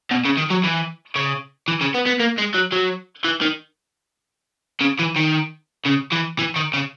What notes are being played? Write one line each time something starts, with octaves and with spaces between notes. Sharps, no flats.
B2
C#3
D#3
F#3
E3
C#3
E3
C#3
B3
B3
A#3
G#3
F#3
F#3
E3
D#3
C#3
E3
D#3
C#3
E3
E3
D#3
C#3